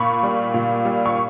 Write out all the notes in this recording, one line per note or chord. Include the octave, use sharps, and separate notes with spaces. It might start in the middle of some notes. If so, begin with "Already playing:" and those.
Already playing: A#2 B5 C#6
G3
A#2
G3
C#6